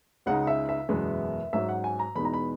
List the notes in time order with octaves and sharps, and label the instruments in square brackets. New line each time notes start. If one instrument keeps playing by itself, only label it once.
[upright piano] C#2 C#3 G#3 D#4 F#5
E5
E5
F#1 E2 B2 G#3 B3
G#2 F#3 C#4 E5
F#5
G#5
A#5
E2 B2 G#3 B3 D#4 B5
A#5
B5